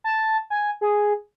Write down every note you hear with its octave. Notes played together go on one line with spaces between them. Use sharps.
A5
G#5
G#4